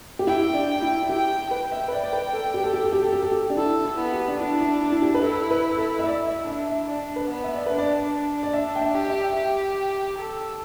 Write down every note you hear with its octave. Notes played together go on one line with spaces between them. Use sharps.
G4
E4 G5
D4
E4
E4
G4 G5
B4 G5
E5
B4
D5
D5
B4
A4
G4
A4
G4
A4
G4
A4
G4
A4
G4
D4
E4 A4
E4
B3
G4
D4
D4 E4
E4
E4
E4
G4
B4
E4 A4
B4
A4
E5
E4 D5
E5
D4 E5
E5
D4 D5
B4
B3
E5
D5
B4
D4
D5
D5
D4 E5
G5
E5
G4
E5
G4
A4